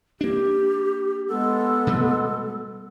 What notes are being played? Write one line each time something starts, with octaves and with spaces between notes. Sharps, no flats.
A#3 D4 G4
G#3 B3 A4
B2 G3 A3